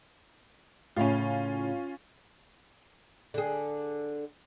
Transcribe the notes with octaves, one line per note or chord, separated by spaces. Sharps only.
A2 C#3 C#4 F4
D3 G#4